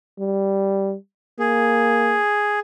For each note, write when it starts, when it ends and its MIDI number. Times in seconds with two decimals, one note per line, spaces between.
0.19 0.95 55
1.39 2.19 58
1.39 2.60 68